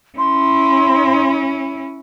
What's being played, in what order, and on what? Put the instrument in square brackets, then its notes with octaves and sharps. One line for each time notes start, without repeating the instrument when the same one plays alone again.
[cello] C#4 E4 [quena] C6